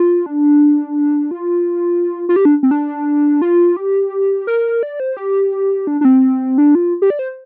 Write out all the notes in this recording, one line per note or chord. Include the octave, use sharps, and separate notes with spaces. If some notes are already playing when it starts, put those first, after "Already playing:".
Already playing: F4
D4
F4
F4
G4
D4
C4
D4
F4
G4
A#4
D5
C5
G4
D4
D4
C4
D4
F4
G4
D5
C5